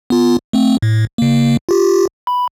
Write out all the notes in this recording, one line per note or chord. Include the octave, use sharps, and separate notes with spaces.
B3 F4
A3 C4
A2
C#3 A#3
F4 G4
B5